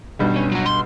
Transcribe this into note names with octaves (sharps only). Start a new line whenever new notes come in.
B1 G2 G3
C#4
F#3 F#4
C6